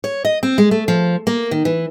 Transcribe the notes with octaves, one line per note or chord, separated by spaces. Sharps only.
C#5
D#5
C4
G#3
A3
F3
A#3
D#3
E3